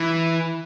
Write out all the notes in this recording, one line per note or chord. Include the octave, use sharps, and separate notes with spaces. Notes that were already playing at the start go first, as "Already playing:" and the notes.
Already playing: E3